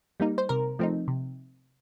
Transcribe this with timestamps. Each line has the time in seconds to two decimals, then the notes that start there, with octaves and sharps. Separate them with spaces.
0.20 G3 A#3 D#4
0.38 C5
0.49 C3 A#4
0.79 F3 A3 C4 D#4
1.08 C3